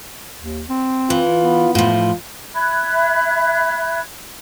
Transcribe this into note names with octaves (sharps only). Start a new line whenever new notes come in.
D#2
C4
E3 F4
B3
A2 F3 F4
E5 B5 F#6 G#6